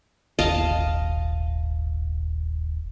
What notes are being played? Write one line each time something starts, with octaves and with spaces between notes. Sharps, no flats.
D#1 G#1 D#5 F5 A5